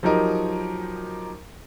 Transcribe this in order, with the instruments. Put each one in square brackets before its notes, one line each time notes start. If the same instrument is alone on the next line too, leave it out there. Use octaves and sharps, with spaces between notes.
[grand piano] F3 F#3 D#4 G4 A#4 D#5